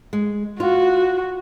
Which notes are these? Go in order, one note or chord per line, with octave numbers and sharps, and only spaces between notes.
G#3
F4 F#4